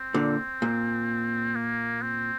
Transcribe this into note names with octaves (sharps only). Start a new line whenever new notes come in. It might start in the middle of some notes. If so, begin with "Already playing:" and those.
Already playing: C4
A#2 D3
A#2
A#3
C4